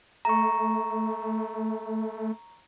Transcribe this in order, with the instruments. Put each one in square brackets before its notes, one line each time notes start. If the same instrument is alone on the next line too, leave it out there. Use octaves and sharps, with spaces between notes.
[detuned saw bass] A3 [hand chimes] A#5 C#6